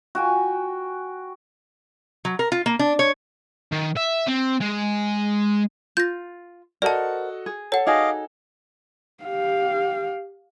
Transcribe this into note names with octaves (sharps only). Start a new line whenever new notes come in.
F#4 G5 G#5
F#3
A#4
F4
A#3
D4
C#5
D#3
E5
C4
G#3
F4 G6 A#6
F#4 A4 A#4 C5 D5 D#5 F#5 A5
G#4
A4 C#5 F#5
D#4 F#4 G#4 D#5 F5 D6
G4 F5